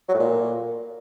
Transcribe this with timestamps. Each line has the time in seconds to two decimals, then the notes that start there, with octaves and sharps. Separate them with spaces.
0.09 F#3
0.14 A2
0.20 A#2